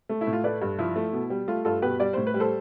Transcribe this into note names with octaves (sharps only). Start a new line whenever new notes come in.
A3
E4
A2
F4
A3 B4 D5
G2
F3 E4
A3
B2
G3
A3 F4
G2 F4 A4
B2 G4 B4
G3 D5
A2 C5
B4
G3
A4 C5